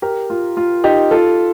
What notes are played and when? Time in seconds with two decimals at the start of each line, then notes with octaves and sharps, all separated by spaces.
0.02 G4 A#4
0.30 F4
0.57 F4
0.84 D#4 G4
1.11 F4 A4